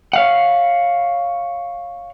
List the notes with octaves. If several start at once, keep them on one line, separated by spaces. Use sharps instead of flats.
C#5 F5 F#5